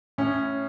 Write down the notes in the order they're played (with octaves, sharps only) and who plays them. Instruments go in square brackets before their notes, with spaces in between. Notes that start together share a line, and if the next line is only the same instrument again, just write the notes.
[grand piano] A2 C#4